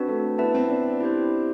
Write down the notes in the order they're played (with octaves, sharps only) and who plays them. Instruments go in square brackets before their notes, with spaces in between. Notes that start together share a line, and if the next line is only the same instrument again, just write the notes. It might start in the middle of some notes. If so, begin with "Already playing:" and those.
Already playing: [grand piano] C4 [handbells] D4 F#4 B4
[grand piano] A3
[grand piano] B3 [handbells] E4 B4 E5 A5
[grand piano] C4
D4
[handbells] E4 G4 C5